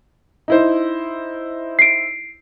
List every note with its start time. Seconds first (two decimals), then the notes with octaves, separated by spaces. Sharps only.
0.48 D#4 E4 C5
1.79 C7 D7